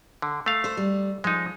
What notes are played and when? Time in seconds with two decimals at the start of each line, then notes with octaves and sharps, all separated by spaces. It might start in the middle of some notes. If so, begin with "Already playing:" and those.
0.22 D3
0.46 A3 F5
0.64 A4 C5
0.77 G3
1.24 F3 G#3 D#4